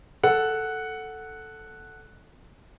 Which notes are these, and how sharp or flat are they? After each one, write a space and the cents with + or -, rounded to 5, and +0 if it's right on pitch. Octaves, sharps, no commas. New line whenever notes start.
A4 +0 F#5 +0